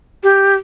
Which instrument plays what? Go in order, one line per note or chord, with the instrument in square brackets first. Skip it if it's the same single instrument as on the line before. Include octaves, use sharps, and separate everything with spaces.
[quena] G4